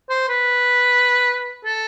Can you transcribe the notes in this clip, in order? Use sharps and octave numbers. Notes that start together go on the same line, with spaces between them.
C5
B4
A4